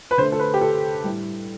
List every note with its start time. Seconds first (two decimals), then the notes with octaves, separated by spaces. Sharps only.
0.11 B4
0.18 D3 C5
0.21 A3
0.32 A4
0.39 B4
0.54 G4
0.61 A4
1.04 A2 G3